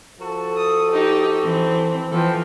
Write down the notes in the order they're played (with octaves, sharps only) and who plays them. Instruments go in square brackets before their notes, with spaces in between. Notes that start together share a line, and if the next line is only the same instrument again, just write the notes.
[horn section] F3 F#4 A4
[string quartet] D#6
D#4 G4
E3 C4
[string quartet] E3 F3 [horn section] B3 A4 G5